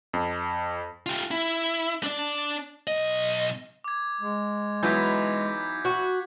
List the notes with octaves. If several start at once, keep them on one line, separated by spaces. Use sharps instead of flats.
F2
F4 G4
E4
D4 D5
B1 D#5
D6 G#6
G#3
E3 F#3 B3 D#4 G6 G#6 B6
F#4